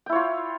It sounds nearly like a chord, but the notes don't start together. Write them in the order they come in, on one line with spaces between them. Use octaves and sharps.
G5 E4 C#5 F4